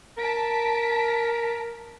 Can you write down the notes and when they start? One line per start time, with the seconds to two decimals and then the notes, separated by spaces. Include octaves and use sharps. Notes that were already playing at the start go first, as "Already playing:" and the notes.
0.17 A#4 A5 B6 D7